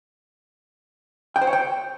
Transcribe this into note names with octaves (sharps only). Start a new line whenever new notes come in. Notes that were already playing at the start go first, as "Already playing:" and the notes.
G5
C5
C#5
G5